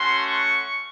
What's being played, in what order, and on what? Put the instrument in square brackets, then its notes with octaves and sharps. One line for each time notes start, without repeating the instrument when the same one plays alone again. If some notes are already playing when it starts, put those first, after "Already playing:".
Already playing: [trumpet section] A3 C#4 F#4 C6
C#6